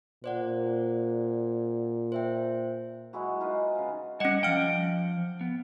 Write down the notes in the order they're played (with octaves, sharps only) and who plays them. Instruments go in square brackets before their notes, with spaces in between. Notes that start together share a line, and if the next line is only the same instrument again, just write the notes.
[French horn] A#2 [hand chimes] C5 D5 F#5
[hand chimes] C5 E5 G5
[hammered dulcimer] F#3 G#3 E4 F#4
D#4 F4 B4 D#5
C#3 F5
[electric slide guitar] G3 F#5 [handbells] C#4 D#5
[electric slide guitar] F3 G5 [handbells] F5 F6
[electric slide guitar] B3